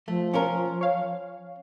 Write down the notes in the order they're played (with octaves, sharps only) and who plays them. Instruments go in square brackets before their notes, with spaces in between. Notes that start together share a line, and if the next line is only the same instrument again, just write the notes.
[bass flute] F3 [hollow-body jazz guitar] A3
[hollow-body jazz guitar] C#4 F4 A#4
[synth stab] C#5 F5